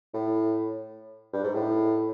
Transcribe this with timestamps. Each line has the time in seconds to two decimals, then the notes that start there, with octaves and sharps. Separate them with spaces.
0.14 A2
1.33 G2
1.43 G#2
1.54 A2